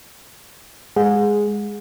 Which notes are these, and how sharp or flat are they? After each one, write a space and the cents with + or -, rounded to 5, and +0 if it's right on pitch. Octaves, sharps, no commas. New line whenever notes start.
G#3 -5 G#4 +0 F#5 -40